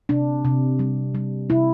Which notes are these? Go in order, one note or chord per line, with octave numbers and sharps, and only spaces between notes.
C3 D4
C3
G3
G3
C3 E4